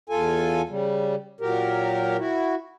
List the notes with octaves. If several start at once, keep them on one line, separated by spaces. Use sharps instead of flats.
E2 F4 A4 G#5
C#3 G3
A#2 F#3 G4 A#4
E4 F#4